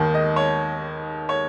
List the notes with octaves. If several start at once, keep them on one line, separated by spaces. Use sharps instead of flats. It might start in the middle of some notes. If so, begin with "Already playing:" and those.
Already playing: D#2 D#3
D#5
C#5
C#5